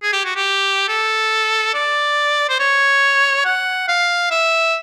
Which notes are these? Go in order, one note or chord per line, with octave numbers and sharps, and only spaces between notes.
G#4
G4
F#4
G4
A4
D5
C5
C#5
F#5
F5
E5